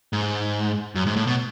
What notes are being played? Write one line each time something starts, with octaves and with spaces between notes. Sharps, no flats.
G#2
F#2
G#2
A2
B2